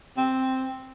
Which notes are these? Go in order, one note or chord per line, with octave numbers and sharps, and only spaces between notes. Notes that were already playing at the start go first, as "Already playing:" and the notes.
C4